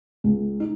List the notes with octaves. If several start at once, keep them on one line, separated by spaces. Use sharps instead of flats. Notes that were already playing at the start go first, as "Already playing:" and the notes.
C#2
D#4